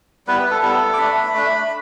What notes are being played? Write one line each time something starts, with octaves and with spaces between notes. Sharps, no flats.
G3 B3 E4 B4
B4
A4
G3 B3 E4 A4
D6
A3 D4 B5
A3 D4